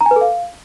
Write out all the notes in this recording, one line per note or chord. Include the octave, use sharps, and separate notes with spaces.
A#5
G#5
B4
A4
F5